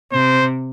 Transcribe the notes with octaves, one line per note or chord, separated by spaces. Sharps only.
C3 C5